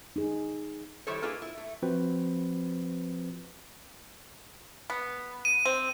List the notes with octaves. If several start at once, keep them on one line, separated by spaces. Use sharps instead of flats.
D#4 G#4
D#3 G3 E4 A4 C5 C#5
A#3 D#4 F4 G#4 A4 B4
E4
A3
F3 C4 F4 F#4 B4 C5
B3
D#7
C4